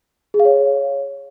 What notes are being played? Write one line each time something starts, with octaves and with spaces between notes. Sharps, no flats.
G#4
F5
C#5